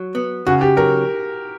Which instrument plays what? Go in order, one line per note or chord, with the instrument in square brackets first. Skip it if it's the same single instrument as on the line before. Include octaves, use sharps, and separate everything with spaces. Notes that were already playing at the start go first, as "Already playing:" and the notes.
Already playing: [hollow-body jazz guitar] F#3
B3
[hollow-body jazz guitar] C#3 [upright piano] F#4
[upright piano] G4
[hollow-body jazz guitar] F#3 [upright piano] A#4